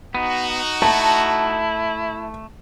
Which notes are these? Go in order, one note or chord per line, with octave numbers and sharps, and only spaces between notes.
B3 D#4 F#4
A3 E4 A5